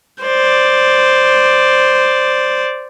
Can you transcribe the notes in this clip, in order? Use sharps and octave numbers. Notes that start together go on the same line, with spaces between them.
C5 D5